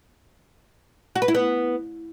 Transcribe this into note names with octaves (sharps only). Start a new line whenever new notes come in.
F#4
B4
E4
B3